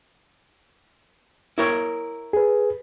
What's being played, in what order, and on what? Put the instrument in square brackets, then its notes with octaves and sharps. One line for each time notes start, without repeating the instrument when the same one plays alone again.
[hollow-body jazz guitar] E4 A#4 C#5
[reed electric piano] G#4 B4